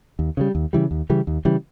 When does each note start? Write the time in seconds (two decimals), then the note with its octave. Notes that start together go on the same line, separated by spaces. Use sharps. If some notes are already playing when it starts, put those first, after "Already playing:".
0.19 D#2
0.37 C#3 E3 G3
0.55 D#2
0.73 C#3 E3 G3
0.91 D#2
1.10 C#3 E3 G3
1.27 D#2
1.45 C#3 E3 G3